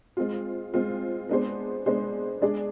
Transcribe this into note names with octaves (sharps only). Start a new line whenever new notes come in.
G#3 C4 F4
G#3 C4 F4
G#3 B3 D4 G#4 C5
G#3 B3 D4 G#4 C5
G#3 D4 G#4 D5